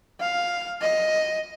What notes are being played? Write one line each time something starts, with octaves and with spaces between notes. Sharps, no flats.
F5
D#5